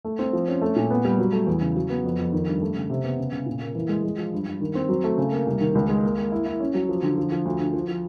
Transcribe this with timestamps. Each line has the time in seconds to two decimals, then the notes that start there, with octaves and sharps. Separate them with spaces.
0.05 A3
0.19 C4
0.33 F3
0.48 C#4
0.61 A3
0.76 A#2
0.90 B3
1.05 G3
1.18 F#3
1.32 A3
1.47 E2
1.61 C#3
1.76 F#3
1.90 B3
2.04 F2
2.19 F2
2.32 D#3
2.47 G2
2.62 A3
2.76 C#3
2.90 C3
3.04 B3
3.18 C#3
3.32 C#3
3.46 A#2
3.61 A#3
3.75 E3
3.89 G#3
4.03 G#3
4.18 F3
4.33 G2
4.46 G2
4.60 D#3
4.75 C4
4.89 F#3
5.04 A3
5.18 C#3
5.32 A#3
5.47 C2
5.61 D#3
5.75 C#2
5.89 G#3
6.04 A#3
6.17 A#3
6.32 E4
6.46 E4
6.60 C#4
6.74 F#3
6.89 F3
7.03 D3
7.17 F3
7.32 F3
7.45 D2
7.60 D3
7.74 F3
7.88 F3